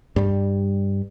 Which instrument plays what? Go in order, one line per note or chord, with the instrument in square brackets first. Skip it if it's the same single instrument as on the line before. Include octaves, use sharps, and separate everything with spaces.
[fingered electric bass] G2 G3